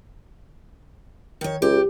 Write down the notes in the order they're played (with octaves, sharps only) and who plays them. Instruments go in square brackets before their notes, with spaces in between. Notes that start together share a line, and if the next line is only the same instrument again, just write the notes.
[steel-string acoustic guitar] D#3 C#5
[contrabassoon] C#2 [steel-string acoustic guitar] G4